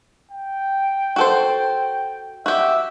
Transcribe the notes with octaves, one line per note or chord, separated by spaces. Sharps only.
G5
F#4 A4 C5
F#4 G4 E5